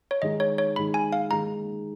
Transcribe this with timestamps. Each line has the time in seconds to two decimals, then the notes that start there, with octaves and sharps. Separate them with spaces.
0.11 C#5
0.22 D#3 G#3 D#4 D#5
0.40 C#5
0.58 C#5
0.76 D#3 G#3 D#4 B5
0.94 G#5
1.12 F5
1.30 D#3 G#3 D#4 A#5